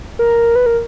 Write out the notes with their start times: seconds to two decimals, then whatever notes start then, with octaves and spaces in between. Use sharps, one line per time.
0.19 A#4
0.55 B4
0.66 A#4